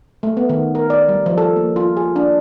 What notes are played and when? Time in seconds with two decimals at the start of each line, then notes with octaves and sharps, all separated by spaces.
0.23 A3
0.37 B3
0.49 D#3
0.75 A#4
0.90 D5
1.09 G3
1.26 F3
1.38 A4
1.56 A#3
1.76 F4
1.97 G#4
2.16 D4